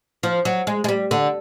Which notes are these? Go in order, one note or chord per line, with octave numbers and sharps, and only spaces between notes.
F3
F#3
G#3
G#3
G3
D3